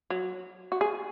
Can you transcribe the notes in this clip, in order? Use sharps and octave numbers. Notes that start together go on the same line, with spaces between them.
F#3
F#4
G#4